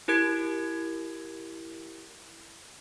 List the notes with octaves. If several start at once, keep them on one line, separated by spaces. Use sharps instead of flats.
E4 G4 A#4 G#6 D7